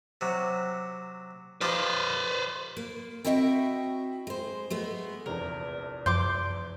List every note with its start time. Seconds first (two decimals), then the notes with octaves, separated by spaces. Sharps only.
0.21 C3 F#3
1.61 F3 D#4 G4 B4 C5
2.77 A#3
3.25 C4 E4 F#4 D#5 E5 G5
4.27 G#3 C5
4.70 G#3 A3 B3
5.26 A#1 E2 C3 A#4
6.06 F#2 F3 C6 D6 G6